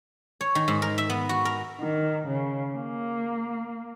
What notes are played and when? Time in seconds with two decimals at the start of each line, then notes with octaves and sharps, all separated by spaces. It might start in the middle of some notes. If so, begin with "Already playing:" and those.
0.41 C#5
0.55 D#3
0.68 G#2
0.82 A#4
0.98 E5
1.10 B3
1.29 F#4
1.45 A#4
1.80 D#3
2.27 C#3
2.75 A#3